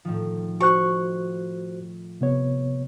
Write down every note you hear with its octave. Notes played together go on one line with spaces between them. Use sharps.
A2 D#3 F3
F#4 C5 C#6 F#6
C3 B3 C#5